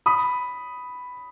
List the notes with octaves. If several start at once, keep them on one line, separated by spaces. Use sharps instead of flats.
B5 D#6